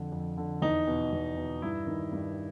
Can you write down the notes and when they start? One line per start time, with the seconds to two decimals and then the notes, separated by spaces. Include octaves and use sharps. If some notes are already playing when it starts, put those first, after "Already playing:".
Already playing: F2 D3
0.12 F2
0.38 D3
0.62 E2 D#4
0.87 B2
1.13 E2
1.37 B2
1.62 G2 E4
1.87 D#3
2.12 G2